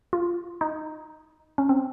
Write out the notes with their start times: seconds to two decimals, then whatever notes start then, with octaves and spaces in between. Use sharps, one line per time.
0.13 F4
0.61 D#4
1.58 C#4
1.69 C4